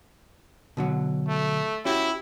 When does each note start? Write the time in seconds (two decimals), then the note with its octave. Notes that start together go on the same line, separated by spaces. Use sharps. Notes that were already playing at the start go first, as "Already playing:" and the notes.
0.77 B2 D3 F#3
1.28 A3
1.85 C#4 E4 F#4 G4